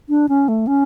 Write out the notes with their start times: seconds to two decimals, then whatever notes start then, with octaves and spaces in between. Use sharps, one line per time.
0.09 D4
0.29 C#4
0.48 A3
0.67 C#4